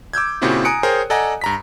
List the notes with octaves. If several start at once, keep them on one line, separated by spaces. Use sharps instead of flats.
D6 E6 G6 G#6
A#2 C#3 C4 E4 F#4 G4
G#5 A#5 D#6 F#6 C#7 D7
G#4 A#4 C5 C#5 G5
A4 D5 D#5 F#5 G#5 A#5
G2 A#5 B6